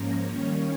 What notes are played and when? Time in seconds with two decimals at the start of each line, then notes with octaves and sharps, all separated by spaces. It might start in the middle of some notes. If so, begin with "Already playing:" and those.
Already playing: G#2 F3 A#3 C#4 A#5
0.26 D#3 G3 A#3 C#4 C#5